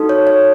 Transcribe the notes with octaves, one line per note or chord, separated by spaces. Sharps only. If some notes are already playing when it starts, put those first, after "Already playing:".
Already playing: D#4 F#4 A4
C#5
C#5